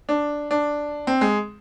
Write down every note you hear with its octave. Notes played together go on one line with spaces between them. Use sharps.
D4
D4
C4
G#3